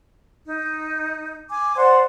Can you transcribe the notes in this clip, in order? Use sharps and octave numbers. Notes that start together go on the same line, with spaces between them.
D#4
G#5 D6
C5 D5 F#5 C6